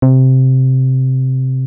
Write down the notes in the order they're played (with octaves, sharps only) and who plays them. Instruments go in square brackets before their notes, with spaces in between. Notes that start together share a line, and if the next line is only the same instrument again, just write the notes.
[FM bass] C3